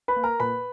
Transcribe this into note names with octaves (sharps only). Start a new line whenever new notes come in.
B4 B5
A#3
A#4 A#5
A#2 B4 B5